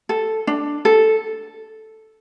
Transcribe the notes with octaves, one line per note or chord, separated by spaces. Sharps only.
A4
D4
A4